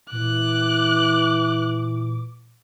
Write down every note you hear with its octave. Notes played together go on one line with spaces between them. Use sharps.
A#2 E3 D6 F#6